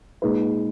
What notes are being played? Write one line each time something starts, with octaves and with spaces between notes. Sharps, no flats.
A#2 G#3 D#4 G#4 B4